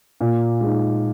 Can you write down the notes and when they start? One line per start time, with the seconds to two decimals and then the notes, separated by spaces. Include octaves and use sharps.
0.21 A#2
0.61 G#3 D#4